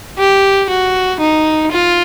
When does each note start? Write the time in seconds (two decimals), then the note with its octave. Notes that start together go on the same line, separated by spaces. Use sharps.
0.19 G4
0.70 F#4
1.20 D#4
1.71 F4